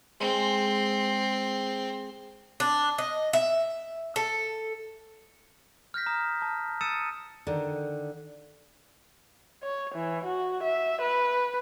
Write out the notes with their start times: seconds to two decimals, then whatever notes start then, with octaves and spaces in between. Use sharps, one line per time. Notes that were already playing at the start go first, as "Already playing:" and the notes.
0.20 G#3 C4
2.60 D4
2.98 D#5
3.33 E5
4.16 A4
5.94 F6 G6 A#6 B6
6.06 A#5 D#6
6.42 A5
6.81 D#6 E6 A6 C#7 D#7 E7
7.47 D3 D#3
9.62 C#5
9.95 E3
10.25 F#4
10.63 E5
11.02 B4